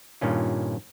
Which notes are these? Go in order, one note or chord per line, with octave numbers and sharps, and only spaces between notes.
G2 A#2 D#3 C#4 F4